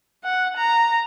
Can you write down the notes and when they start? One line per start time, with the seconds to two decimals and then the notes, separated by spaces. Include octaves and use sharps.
0.24 F#5
0.57 A#5